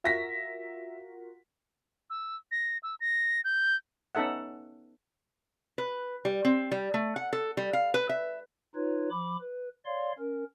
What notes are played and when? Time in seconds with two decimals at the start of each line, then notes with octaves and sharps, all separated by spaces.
0.04 F4 F#4 A#4 E5 A#6 B6
2.10 E6
2.51 A#6
2.83 E6
3.00 A#6
3.44 G6
4.15 B3 C#4 D#4 A4 E5 F#5
5.78 B4
6.25 G3
6.45 C4
6.72 G3
6.94 A3
7.16 F#5
7.33 A4
7.57 G3
7.73 F5
7.94 B4
8.09 E5
8.75 D#4 F4 B4 C#5
9.11 F3 B5 D6
9.41 B4
9.86 C#5 D5 F5 C6
10.19 C#4 A#4